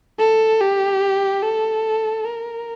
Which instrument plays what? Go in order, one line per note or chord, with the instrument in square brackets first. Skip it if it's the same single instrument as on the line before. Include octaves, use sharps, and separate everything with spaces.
[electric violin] A4
G4
A4
A#4